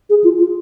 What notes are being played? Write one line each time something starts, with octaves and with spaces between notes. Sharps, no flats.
G#4
F4
F4